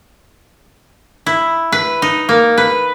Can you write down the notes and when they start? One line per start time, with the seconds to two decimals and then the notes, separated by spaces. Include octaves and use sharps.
1.26 E4
1.72 B4
2.02 D#4
2.29 A#3
2.58 B4